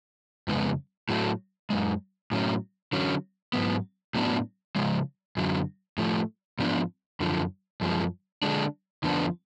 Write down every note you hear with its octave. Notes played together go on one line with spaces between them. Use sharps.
F2 C#3 G#3 B3
A2 F#3 A3
F#2 C#3 G#3
A2 F#3 C#4
D3 F#3 C#4
G#2 F#3 B3
A2 F#3 B3 D4
C#3 F3 G#3
F#2 D3 F#3
A2 F3 A3
G#2 F3 B3 D4
F#2 D3 F3
F#2 F3 G#3
D3 G#3 D4
F2 D3 F3 B3 D4